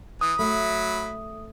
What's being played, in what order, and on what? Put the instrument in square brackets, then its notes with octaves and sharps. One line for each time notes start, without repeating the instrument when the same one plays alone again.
[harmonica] E3 [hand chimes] D#6
[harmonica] F#3 B5 [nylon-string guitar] A3